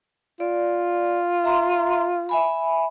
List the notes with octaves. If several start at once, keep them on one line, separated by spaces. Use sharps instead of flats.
F4 D5
E5 A#5 C6
E5 G#5 B5